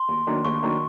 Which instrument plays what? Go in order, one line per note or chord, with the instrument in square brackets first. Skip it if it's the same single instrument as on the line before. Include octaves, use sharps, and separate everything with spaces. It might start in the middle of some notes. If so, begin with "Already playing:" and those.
Already playing: [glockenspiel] C6
[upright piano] D#2
D#3 F#3 A#3 D4
[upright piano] D#2 [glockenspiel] C#6
[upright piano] D#3 F#3 A#3 D4